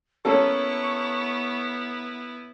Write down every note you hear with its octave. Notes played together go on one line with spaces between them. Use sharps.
A#3 B3 C#4 E4 A4 C#6